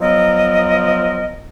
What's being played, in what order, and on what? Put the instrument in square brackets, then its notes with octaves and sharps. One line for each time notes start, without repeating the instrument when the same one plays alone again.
[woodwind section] F3 F#3 B3 A#4 D#5